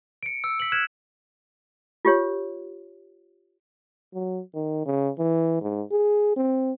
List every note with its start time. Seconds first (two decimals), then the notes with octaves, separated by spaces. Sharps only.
0.23 C#7 D7
0.44 E6
0.60 B6 F#7
0.72 F6 F#6 G#6 B6 E7
2.05 F4 G4 C#5
4.14 F#3
4.54 D#3
4.85 C#3
5.19 E3
5.62 G#2
5.91 G#4
6.36 C4